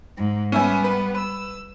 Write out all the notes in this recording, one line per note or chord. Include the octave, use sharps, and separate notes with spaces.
G#2
G3 B3 C#4 E5 G#5
B4
E6